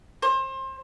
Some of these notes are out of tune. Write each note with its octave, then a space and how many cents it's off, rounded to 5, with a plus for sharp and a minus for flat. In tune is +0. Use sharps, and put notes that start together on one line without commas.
C5 +30